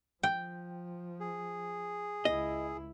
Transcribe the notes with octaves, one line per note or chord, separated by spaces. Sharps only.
F3 G5
G#4
C#2 E4 D#5